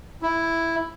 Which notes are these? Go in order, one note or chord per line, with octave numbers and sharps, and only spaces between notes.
E4